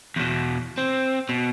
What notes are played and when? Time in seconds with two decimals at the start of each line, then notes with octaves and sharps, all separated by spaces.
0.16 E2 B2
0.78 C4
1.29 B2